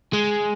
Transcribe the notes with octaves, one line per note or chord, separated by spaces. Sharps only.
G#3